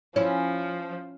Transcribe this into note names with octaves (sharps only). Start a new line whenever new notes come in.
F3 C#4 E4